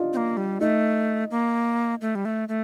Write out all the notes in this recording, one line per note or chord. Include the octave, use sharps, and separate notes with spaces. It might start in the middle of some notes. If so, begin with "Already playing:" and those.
Already playing: D4 D#4 F4
C4
A#3
G3
A3 D#4
A#3
A3
G3
A3
A3